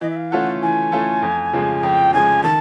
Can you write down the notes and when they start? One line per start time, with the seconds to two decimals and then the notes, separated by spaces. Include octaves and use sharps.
0.01 E3 D#5
0.10 E5
0.16 F5
0.31 A3 C#4 F4 A4 F#5
0.62 E3 G#5
0.92 A3 C#4 F4 A4
1.22 F2
1.53 C#3 F3 G#3
1.83 F2 G5
2.13 C#3 F3 G#3 G#5
2.43 D#3 A5